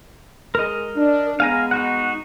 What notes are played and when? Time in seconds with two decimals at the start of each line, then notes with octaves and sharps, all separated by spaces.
0.55 G#3 A#4 D#5
0.96 D4
1.40 G#3 B3 F5 G#5 A#5
1.71 D#4 F#4 F#5